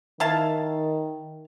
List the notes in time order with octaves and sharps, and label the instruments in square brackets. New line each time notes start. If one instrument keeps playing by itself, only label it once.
[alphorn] D#3 [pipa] E4 F5 A5